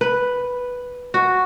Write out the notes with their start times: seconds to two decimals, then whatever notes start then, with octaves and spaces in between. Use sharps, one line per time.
0.01 B4
1.14 F#4